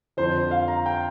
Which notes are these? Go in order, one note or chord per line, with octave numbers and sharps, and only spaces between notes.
F2 D3 F3 C5
F5
A#5
G5